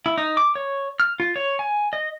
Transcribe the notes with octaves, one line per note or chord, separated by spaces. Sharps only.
E4
D#4
D6
C#5
F6
F4
C#5
G#5
D#5